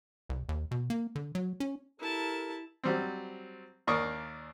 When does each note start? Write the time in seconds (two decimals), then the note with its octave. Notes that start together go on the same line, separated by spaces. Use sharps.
0.29 C2
0.49 D#2
0.71 B2
0.90 A#3
1.15 D3
1.35 F#3
1.60 C#4
2.00 E4 G4 A4 A#4 A5
2.84 F#3 G3 C4
3.87 D#2 A#3 D5 C#6 D#6